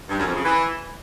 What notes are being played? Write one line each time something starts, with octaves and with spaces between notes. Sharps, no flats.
G2
F#2
F2
C#3
E3